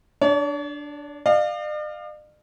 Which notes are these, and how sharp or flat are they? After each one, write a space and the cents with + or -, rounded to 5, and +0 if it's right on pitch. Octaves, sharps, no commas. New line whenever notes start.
D4 +0 C#5 +45
D5 +45 F5 +0